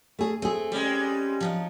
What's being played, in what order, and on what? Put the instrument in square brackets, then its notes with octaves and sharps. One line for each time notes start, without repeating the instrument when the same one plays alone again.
[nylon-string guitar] A3 G#4
[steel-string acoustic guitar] A3 [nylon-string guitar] C4 G#4
[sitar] G3 G#3 [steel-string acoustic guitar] C#4
[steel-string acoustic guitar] F3 F#3 D#4